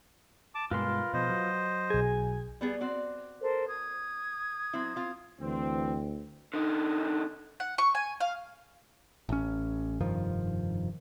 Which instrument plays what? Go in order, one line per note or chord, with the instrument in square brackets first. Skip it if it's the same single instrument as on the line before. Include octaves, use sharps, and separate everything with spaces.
[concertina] A5 D6
[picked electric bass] G2 B2 G#3 [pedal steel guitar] F4 B4 C6 [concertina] A#4
[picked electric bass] B2 F3 [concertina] C5 D#5
[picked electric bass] F#3
[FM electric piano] B1 G#4 [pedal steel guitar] G#5
[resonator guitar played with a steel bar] G3 B3 G#4
C4 F#4 D5
[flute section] A4 A#4 C5
D#6 G#6
[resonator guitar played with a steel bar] F#3 C4 E4
C4 F4
[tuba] D2 [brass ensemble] E3 C4
[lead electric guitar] D3 D#4
[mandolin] F#5
C#6
G#5
F5
[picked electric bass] A1 C#4
F1 G2 D#3 F3